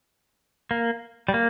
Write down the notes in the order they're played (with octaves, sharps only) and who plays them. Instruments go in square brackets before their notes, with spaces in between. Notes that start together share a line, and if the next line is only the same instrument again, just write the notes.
[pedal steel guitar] A#3
G3
A#3